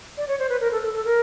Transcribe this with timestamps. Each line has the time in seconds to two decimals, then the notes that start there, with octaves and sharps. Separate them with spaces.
0.17 D5
0.28 C#5
0.39 C5
0.49 B4
0.60 A#4
0.72 A4
0.83 A4
0.94 A4
1.05 A#4